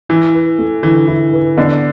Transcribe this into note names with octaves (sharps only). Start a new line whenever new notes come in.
E3 E4
B4
A3
D3 E3
E4
B4
D3 B3